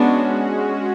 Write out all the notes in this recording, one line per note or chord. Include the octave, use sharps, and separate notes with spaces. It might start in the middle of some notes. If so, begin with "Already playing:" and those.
Already playing: G#3 B3 C#4 D4 F#4